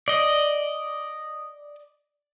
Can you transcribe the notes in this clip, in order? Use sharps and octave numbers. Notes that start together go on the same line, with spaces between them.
D5 D#5